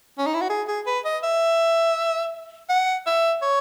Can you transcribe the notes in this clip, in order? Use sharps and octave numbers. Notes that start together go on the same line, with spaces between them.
C#4
D#4
E4
F#4
G#4
G#4
B4
D#5
E5
F#5
E5
C#5